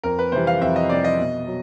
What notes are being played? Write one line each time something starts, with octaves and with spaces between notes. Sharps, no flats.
F2 A#4
B4
C3 E3 G3 C5
F5
F2 E5
D#5
C3 E3 G3 D5
D#5
B2
F#3